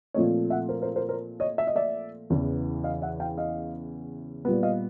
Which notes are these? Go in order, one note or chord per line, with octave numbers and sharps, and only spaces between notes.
A#2 F3 A3 C4 C#5 D#5
E5 F#5
A#4 C5
A#4 C5
A#4 C5
A#4 C5
C#5 D#5
E5
D#5
D5 E5
E2 C#3 E3
D#5 F5
E5 F#5
F5 G5
D#5 F5
A#2 G3 B3
D#5 F5